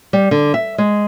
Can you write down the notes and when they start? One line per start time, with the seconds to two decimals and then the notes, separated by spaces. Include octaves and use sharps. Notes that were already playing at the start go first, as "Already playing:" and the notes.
0.13 G3
0.31 D3
0.54 E5
0.78 G#3